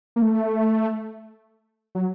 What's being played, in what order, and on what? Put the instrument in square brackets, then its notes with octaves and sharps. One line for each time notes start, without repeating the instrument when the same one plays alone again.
[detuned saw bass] A#3
A3
F#3